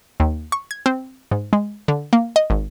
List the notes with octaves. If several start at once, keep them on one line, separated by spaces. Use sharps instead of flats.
D#2
C#6
G#6
C4
G#2
G#3
D3
A#3
D#5
G#1